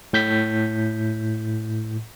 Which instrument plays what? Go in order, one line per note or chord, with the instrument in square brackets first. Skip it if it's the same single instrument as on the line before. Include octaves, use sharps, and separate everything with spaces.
[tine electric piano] A2 G6 B6